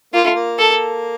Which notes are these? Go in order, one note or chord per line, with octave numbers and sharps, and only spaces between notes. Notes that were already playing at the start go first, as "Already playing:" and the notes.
A#3 F4
A3
A#3
A4